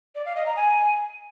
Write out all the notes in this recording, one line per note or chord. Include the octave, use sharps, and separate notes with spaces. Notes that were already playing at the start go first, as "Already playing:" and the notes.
D5
F5
D#5
A#5
G#5